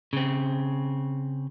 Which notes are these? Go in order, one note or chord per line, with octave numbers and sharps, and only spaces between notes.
C#3 C4